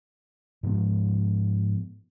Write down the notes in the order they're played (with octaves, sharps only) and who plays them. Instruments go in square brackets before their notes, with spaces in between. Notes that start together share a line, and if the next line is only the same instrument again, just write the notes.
[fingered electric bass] G#2 F3 B3